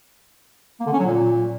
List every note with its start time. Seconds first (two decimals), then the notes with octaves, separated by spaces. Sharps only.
0.80 A#3
0.86 D3
0.93 C#4
0.99 F#3
1.06 A#2